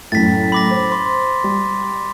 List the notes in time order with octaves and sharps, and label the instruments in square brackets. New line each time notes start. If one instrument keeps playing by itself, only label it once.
[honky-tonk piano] F#2 A2 [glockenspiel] A6 B6
[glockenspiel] B5 D6 A#6
[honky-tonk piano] C5
[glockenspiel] C6
[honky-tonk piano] G3